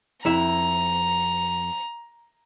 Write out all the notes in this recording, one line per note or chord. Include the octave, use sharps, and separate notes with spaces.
F2 E4 E5 A#5